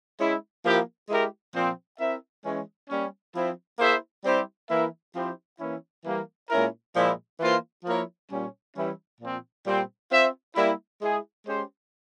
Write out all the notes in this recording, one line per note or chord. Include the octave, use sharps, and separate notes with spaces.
G#3 C#4 E4
F3 A#3 E4 G4 A#4
G#3 E4 G4 A#4
A#2 F3 C4
C4 E4 A#4 E5
E3 G#3 C#4
G3 A#3 C#4
F3 C4 E4
A#3 E4 G#4 C5 E5
G3 C4 E4 G4 C5
E3 A#3 E4 A#4 E5
F3 C4 E4 G4 C5
E3 A#3 C#4 E4
E3 G3 A#3
A#2 G#3 C#4 E4 A#4
A#2 F3 G#3 E4
E3 A#3 F4 C5
F3 A#3 E4 A#4 C#5
A#2 G3 C#4
E3 G3 C#4 E4
A#2 F3 C4
A#2 G3 C4
C4 F4 C5 E5
G3 A#3 E4
G#3 E4 G#4
G#3 C#4 G4 C5